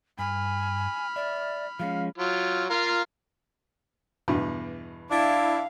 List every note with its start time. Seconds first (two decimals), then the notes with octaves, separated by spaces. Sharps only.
0.19 G2 G#5 B5 F6
1.16 D5 E5
1.80 F3 G#3 C#4 F5
2.18 F#3 F4
2.70 F4 A#4 F5
4.28 E2 G2 B2
5.11 D4 E4 F5